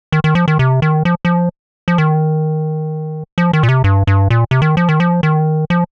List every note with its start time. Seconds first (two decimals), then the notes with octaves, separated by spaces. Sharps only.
0.12 D#3
0.24 D#3
0.35 F3
0.48 D#3
0.59 C3
0.82 D#3
1.05 F3
1.25 F3
1.88 F3
1.98 D#3
3.38 F3
3.53 D#3
3.63 A#2
3.69 C3
3.84 G2
4.07 G2
4.30 A#2
4.51 C3
4.62 D#3
4.77 F3
4.89 D#3
5.00 F3
5.23 D#3
5.70 F3